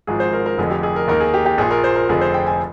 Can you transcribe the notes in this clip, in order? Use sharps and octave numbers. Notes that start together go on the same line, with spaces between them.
G#1 G#2 F3 G#4
C5
A#4
A#4
F1 F2 D3 G#4
G4
G#4
A#4
D#2 D#3 A#4
G#4
G4
G4
A#1 A#2 F3 G#4
A#4
C5
A#4
F1 F2 D3 F3 G#4
C5
G5
G#5